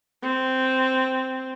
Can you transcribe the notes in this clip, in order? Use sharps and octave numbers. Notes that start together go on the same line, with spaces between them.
C4